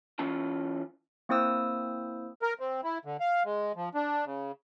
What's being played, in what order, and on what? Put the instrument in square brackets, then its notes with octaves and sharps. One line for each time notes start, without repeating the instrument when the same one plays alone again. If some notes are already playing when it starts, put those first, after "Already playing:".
[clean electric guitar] E3 C#4 F4 A5
[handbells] A#3 C4 E4 C5 D#6 E6
[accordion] A#4
C4
E4
D3
F5
G#3
F3
D4
C#3